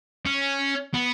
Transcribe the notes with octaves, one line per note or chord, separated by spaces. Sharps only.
C#4
B3